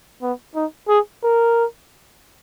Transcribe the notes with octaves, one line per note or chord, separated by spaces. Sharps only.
B3
D#4
G#4
A#4